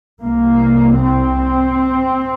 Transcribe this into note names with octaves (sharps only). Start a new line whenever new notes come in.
C2 C3 A#3
C4